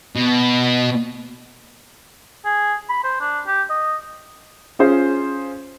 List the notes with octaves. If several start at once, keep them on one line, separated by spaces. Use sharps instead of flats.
B2
G#4
B5
C5
D4
G4
D#5
C#4 F4 G#4 C5